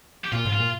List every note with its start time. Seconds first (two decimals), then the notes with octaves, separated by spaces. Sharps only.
0.25 G4
0.32 A#2 F4
0.45 G#2
0.53 F4
0.59 A#2